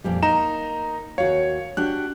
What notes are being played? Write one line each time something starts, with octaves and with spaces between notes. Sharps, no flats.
F2 A#2 G3
A#3 D#4 A#5 E7
D#2 F#4 C#5 F5
D4 F#4 G4 F#6